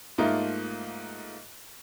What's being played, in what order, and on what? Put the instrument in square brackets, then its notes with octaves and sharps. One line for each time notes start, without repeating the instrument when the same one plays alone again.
[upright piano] G#2 A3 A#3 D#4 F4